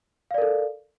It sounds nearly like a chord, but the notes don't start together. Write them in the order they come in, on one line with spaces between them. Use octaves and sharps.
F5 D5 A#4 A4